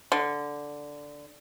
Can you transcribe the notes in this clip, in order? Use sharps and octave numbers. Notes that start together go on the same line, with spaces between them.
D3